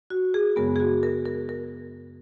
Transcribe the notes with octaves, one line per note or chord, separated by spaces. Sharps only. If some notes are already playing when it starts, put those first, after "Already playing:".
F#4
G#4
F#2 C#3 G#3 B3 A#4
G#4
F#4
A#4
A#4
A#4